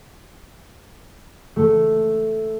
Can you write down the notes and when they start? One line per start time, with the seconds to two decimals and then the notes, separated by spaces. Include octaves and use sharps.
1.56 A3